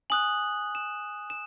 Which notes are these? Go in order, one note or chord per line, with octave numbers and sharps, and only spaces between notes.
G#5 D#6 F#6 F#7
E7
E7